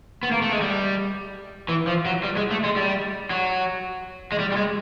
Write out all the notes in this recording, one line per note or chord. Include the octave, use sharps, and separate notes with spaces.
B3
A#3
A3
G#3
G3
E3
F3
F#3
G3
G#3
A3
G#3
G3
F#3
G#3
G3
G3
G#3